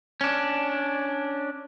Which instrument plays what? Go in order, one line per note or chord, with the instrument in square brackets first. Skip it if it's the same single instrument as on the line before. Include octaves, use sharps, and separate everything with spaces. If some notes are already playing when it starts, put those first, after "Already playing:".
[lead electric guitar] C#4 D4